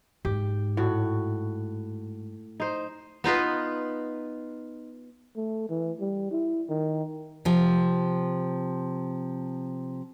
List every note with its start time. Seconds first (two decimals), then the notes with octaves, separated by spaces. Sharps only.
0.25 G#2 G4
0.77 A2 F#4
2.60 D#4 C5
3.24 B3 D#4 F4 B4
5.36 A3
5.70 E3
6.00 G3
6.31 E4
6.69 D#3
7.45 C3 F3